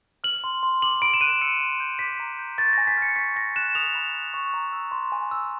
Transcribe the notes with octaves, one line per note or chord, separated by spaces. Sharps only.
F6 F#7
C6
C6
D6 F#7
B5 D7
E7
F#6 D#7
E6 C#7
C6
G6
D6 B6
A#5
G6
C#6 A6
G#5 A#6
B6
F6
C#7
C#6 B6
G#5 A#6
F#6 E7
D#6 F7
B5
F#6
C#6
A#5
E6
C6
G#5
E6